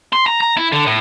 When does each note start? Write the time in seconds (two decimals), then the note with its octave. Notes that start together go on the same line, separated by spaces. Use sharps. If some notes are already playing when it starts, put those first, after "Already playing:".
0.13 C6
0.27 A#5
0.41 A#5
0.57 E4
0.72 D3
0.87 A2